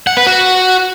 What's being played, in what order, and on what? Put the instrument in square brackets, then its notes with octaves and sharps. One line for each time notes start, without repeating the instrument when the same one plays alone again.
[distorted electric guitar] F#5
B4
F#4